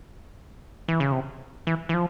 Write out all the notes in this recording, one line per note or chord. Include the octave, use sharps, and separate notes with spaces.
E3
C#3
C3
E3
E3
F3